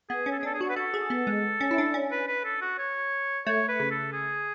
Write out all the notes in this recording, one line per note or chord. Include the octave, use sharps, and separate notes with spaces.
B3 G#4
C#4
A4
G#4
D4 A4
G#4
F#4 C#5
B4
F#4 A4
G#4
B3
G#3
C#4
E4
D4
C#4
B4
B4
A4
F#4
C#5
A3 C#5
B4
C#3
A4
G#4